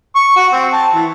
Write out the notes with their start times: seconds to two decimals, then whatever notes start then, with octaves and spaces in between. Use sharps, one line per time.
0.16 C#6
0.36 F#4
0.53 C4
0.73 A5
0.94 E3